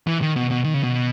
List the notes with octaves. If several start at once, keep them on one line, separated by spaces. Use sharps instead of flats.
E3
D#3
B2
B2
D#3
C#3
B2